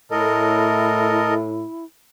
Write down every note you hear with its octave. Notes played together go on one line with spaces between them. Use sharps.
A2 E4 A4 A#4 D#5